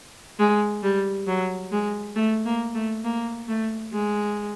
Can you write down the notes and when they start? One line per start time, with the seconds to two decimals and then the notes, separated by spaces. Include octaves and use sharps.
0.39 G#3
0.83 G3
1.27 F#3
1.71 G#3
2.15 A3
2.45 A#3
2.75 A3
3.04 A#3
3.48 A3
3.93 G#3